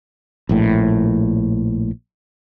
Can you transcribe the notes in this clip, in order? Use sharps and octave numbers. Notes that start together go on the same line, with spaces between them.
A#1 A2